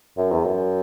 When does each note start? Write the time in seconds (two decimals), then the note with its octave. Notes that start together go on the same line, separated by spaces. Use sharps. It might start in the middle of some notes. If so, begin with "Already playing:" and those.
0.18 F#2
0.31 E2
0.45 F#2